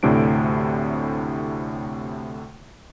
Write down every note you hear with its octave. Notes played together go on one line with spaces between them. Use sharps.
D2 A2 C3 D4 D7